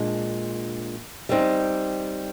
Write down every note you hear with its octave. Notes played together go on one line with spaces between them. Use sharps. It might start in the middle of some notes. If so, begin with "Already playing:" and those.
Already playing: A#2 G#3 D4
G3 C4 D#4